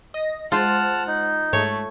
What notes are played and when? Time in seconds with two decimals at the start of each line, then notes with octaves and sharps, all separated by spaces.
0.14 D#5 A#6
0.52 G#3 F4 C5 F#5 A5 F6 A6
1.07 D#4
1.53 G#2 A3 C#5